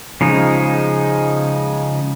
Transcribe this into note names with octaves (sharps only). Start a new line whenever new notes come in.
C#3 F3 G#3 D#4